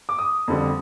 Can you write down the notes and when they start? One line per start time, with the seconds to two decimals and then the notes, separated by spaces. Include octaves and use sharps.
0.09 D6
0.18 D#6
0.48 F2 D3 G3